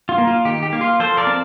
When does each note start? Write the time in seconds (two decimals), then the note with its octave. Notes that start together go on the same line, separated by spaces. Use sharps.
0.09 F4
0.18 A#3
0.27 F4
0.45 D#3 G4
0.63 G4
0.73 A#3
0.81 F4
1.00 F3 A4 C5
1.17 A#4 D5
1.27 C4 A5